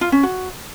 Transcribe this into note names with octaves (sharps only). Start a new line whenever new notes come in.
F4
C#4
F#4